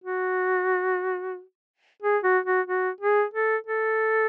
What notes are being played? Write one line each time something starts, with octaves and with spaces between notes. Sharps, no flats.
F#4
G#4
F#4
F#4
F#4
G#4
A4
A4